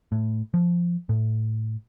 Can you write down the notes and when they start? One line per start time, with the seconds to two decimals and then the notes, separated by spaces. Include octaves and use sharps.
0.12 A2
0.54 F3
1.09 A2